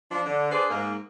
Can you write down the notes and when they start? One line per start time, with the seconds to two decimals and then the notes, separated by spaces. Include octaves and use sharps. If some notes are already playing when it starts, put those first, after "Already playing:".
0.11 F3 D4
0.25 D3
0.51 D4 G#4 B4 C5 D5
0.70 G#2 A#3